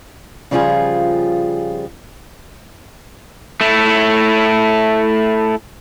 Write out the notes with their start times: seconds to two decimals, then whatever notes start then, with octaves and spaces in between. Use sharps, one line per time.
0.51 C#3 F3 G3 F4 F#4 G#4
3.61 A3 E4